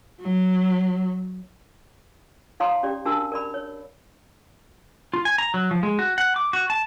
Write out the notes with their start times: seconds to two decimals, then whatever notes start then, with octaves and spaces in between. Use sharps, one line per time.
0.21 F#3
2.60 D#4 C#5 F5 A#5 C6 D#6
2.83 C#4 G4 D5
3.05 D4 F#4 A#4 A5 E6
3.32 A#4 D5 B5
3.54 C#5
5.13 F4
5.25 G#5
5.38 A#5
5.54 F#3
5.71 F3
5.83 G#3
5.99 F#4
6.18 F#5
6.36 D6
6.53 F#4
6.70 A5